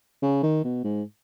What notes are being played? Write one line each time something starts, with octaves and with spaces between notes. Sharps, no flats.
C#3
D#3
B2
G#2